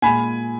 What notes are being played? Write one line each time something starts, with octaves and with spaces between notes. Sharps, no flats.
A#2 G#3 G#5 B5